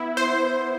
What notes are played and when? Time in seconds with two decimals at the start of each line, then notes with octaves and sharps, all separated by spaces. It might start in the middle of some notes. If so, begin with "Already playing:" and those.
Already playing: B3 E4
0.17 C5